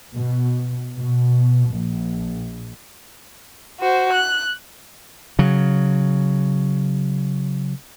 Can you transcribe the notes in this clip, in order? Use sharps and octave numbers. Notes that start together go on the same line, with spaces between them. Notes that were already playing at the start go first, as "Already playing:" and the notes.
B2
B2
A#1
F#4 C5
F#6
C#3 F#3